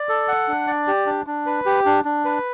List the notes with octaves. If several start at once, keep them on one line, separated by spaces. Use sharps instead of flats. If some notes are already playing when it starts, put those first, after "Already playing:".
Already playing: D5
A4
F#5
D4
D5
G4
D4
D4
B4
G4
D4
D4
B4